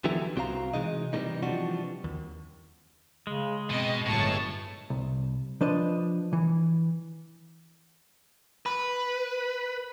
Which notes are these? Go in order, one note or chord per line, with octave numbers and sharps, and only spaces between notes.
D3 E3 F#3 B3 E4 G4
C2 C4 F#4 C5 F5 A#5
C3 E3 G#3 D#4 D#5
C3 E3 F3 G3 A3 D#4
C3 E3 F3 G3 D4 F#4
D#2
C#3 G#3
B2 C4 D#5
G1 A2 F#3 A5 C#6
C2
F3 D4 B4 D#5
E3
B4